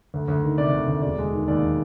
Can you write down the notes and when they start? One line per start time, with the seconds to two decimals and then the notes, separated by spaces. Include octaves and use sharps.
0.14 D2
0.28 D2
0.43 D#3
0.58 C3 D5
0.73 D2
0.88 D2
1.02 E1 D5
1.18 G#3
1.32 D#3
1.48 D#2 D5